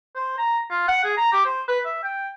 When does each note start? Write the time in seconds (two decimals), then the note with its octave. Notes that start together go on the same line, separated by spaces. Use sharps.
0.15 C5
0.38 A#5
0.70 F4
0.88 F#5
1.04 G#4
1.17 A#5
1.32 G4
1.45 C5
1.68 B4
1.85 E5
2.03 G5